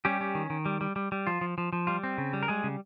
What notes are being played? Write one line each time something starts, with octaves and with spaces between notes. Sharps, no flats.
G3 C#4 G4
C#4
D#3
D#3
G3
G3
G3
G3
F3 F4
F3
F3
F3
G3 F4
C4
C#3
G3
A#4
G3 G#3 G#4
C#3